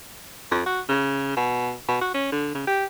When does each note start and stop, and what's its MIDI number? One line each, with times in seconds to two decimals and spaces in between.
0.51 0.64 41
0.66 0.81 66
0.89 1.34 49
1.37 1.74 47
1.88 2.00 47
2.01 2.09 66
2.14 2.28 61
2.32 2.53 50
2.55 2.66 49
2.67 2.85 67